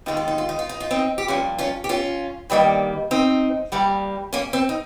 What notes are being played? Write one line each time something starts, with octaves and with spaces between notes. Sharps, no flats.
D#2 D#3 G#3 D#4
F4
D#4
F4
D#4
F4
D#4
F4
C4 D#4
G4
G2 F3 A#3 C#4 F4
C#4 F4
G4
C#4 F4
G2 D#3 G3 A#3
C4 D#4
G2 G3 A#3
A#3 C#4
C4
D#4